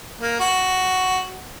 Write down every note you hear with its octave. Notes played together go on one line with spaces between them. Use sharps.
A#3
F#4